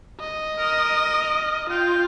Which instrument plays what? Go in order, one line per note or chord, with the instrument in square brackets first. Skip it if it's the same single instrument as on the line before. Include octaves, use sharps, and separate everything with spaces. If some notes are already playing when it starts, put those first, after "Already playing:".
[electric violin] D#5
[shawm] A#4
[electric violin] F4 [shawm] G5